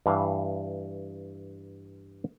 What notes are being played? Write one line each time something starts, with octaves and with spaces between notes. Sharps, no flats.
G2 E3 F5